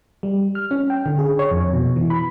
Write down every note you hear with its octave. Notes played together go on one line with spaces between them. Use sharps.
G3
F6
C#4
G5
D3
G#4
C#5
F2
B2
E3
B5